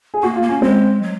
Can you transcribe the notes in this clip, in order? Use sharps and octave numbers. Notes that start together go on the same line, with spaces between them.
G#4
A#3 F#4
F4
A#3
C#4
G#3 C4
F#3